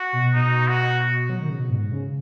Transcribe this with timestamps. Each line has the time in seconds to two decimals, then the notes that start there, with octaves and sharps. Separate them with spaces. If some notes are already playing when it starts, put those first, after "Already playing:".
Already playing: F#4
0.13 B2
0.34 B2 D#4
0.68 F#4
1.29 F#3
1.40 D#3
1.49 C#3
1.59 B2
1.70 G#2
1.92 C#3